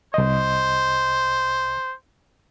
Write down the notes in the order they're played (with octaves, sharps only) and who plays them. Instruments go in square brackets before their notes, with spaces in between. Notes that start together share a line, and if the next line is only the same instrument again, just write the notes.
[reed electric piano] C2 D#5 [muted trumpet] C5